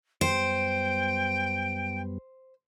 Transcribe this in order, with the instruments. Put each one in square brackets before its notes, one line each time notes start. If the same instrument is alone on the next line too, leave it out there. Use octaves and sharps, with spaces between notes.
[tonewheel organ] F#2 G3 B3 [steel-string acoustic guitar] C5 [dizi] G5 [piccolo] D7